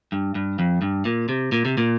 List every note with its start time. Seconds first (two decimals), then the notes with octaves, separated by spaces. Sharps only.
0.12 G2
0.35 G2
0.59 F2
0.82 G2
1.05 A#2
1.29 C3
1.52 A#2
1.65 C3
1.78 A#2